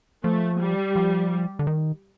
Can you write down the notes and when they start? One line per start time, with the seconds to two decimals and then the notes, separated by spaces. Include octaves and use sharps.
0.24 F3 A3
0.60 G3
0.96 F3
1.59 D3
1.67 D#3